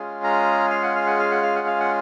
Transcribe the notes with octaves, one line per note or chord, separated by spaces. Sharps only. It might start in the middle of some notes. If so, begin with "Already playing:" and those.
Already playing: G#3 C#4 F4 G#4
A#5
F5
F#5
F5
F#5
F5
F#5
F5
F#5
F5
F#5